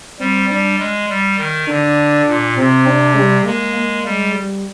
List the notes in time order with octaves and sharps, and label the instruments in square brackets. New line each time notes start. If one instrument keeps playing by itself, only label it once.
[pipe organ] G3 [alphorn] C4
[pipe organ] G3 [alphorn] D4
[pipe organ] G#3
G3
D#3
[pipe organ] D3 [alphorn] D4
[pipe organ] A#2
[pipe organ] C3 [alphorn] C4
[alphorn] D4
G3
[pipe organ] G#3 [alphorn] A#3
[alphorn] A#3
[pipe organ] G3 [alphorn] G#3
[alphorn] G3